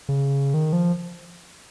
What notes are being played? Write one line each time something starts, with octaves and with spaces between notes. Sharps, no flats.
C#3
D#3
F3